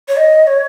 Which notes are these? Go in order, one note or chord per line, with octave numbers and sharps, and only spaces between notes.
C#5
D#5
C#5